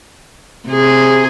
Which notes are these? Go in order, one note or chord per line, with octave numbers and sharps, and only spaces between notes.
C3 G#4